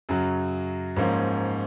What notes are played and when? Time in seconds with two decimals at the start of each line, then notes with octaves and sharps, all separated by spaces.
0.09 F#2 C#3 F#3
0.96 G#2 F3 A#3 C#4